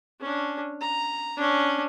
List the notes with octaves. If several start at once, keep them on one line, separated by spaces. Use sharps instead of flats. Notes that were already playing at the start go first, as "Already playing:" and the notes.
C#4 D4
A#5
C#4 D4